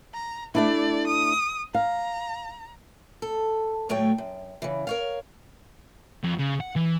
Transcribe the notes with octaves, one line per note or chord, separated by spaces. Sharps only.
A#5
A3 D4 E4 D5
D#6
F5 A#5
A4
D2 A2 F#3 A3 C#5 G5
F#2
C#3 E3
A#4 C#5 F5
F2
C#3
F#5
E3